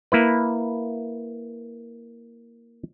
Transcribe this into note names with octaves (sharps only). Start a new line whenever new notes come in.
A#3 E4 B4